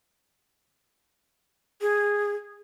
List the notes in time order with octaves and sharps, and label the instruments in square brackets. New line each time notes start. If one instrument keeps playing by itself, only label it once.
[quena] G#4